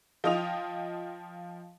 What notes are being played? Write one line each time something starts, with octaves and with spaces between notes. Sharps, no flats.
F3 F4 D#5 G5 D#6 F7